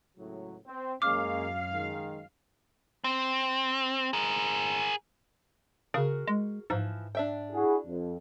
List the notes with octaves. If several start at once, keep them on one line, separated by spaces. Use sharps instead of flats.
C#2 A2 F#3
C4
F#2 G#3 A#3 C#4 F5 D6 F6
D#3 G#3
C4
G#4 A#4
C#3 F#4 G#4 A#4
G#3
G#2 E3 F3
D4 E5 G5
E4 F#4 G#4
F2